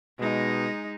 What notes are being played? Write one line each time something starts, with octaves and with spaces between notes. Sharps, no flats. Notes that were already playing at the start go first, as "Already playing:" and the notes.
B2 G#3 D#4